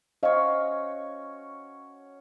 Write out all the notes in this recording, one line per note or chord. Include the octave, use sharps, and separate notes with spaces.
C#4 F#4 C5 C#5 D#5 F5